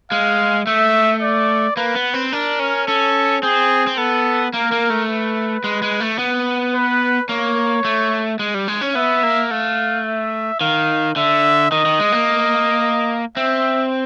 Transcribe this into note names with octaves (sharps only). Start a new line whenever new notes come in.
G#3 F5
A3 E5
D5
A#3 B4
B3
C4
D4 A#4
C#4
C#4 A4
C4 G#4
C4
B3 A4
A#3 A#4
A#3
A3
B4
G#3
G#3
A3
B3
B4
A#3 C#5
A3
G#3
G3
G#3
C#4
B3 E5
A#3
A3 F5
E5
D#3 F5
D3 E5
D#3 D#5
D#3
G#3
A#3
C4 E5